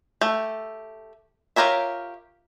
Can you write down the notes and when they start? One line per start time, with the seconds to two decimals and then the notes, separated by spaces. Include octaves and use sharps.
0.21 A3 G4
1.56 F4 G4 A#4 C#5 E5